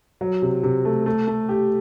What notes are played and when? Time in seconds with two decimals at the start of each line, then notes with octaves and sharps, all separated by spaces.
0.21 F#3
0.42 C3
0.63 C3
0.85 A3
1.06 A3
1.27 A3
1.49 G4